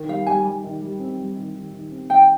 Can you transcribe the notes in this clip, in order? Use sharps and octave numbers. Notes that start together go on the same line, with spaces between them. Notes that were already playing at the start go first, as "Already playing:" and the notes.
Already playing: D#3
G3 F5
G3 G#5
G3
D#3
G3
C4
G3
D#3
D#3
D#3
C4
D#3 G5